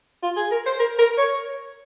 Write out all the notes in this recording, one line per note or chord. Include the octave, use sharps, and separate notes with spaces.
F4
G#4
A#4
C5
A#4
A#4
C#5